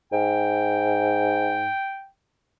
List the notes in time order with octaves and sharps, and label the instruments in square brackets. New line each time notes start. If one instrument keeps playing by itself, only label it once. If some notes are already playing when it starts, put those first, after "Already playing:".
[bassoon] G#2 [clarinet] G5